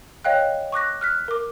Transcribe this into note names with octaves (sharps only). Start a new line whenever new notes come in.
C#5 D#5 F5 G5 F#6
C#6 D6 F#6 A#6
F6 F#6 B6
A#4 D6